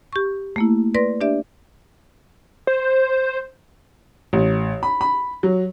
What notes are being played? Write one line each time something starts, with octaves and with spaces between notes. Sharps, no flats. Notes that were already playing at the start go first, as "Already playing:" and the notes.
G4 C#6
A3 A#3 E4
B4 D5 C6 A#6
D4 G4 D5 E5
C5
A1
B5
B5
F#3